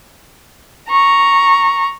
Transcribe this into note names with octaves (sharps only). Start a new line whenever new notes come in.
A#5 C#6